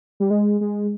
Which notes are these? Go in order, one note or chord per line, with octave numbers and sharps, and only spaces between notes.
G3
G#3
G#3